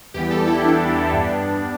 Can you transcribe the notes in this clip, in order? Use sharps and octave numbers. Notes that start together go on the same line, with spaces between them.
E2 E3 G3 B3 G4
A4
E4
D4
G2 G3 B3